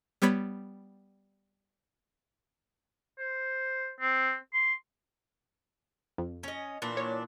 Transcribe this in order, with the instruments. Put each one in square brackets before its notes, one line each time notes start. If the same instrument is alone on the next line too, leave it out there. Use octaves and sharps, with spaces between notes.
[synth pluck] G3 B3 C#5 B5 B6
[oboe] C5
C4
C6
[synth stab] F2
[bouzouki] C#4 D#5
A#2 E3 D4
[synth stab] C#5